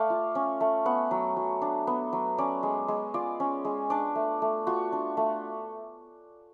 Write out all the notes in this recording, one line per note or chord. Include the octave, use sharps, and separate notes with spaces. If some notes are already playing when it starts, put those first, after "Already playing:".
Already playing: A3 D5 F5
F4
C#4
A3
B3 F#5
F#3
F#3
D4
B3
F#3
C#4 D5
G#3
G#3
F4 D5
C#4
G#3
D4 D5
A3
A3
F4 F#4
D4
A3